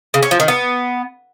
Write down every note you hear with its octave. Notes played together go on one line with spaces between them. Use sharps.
C#3
C#4
F3
D#3
B3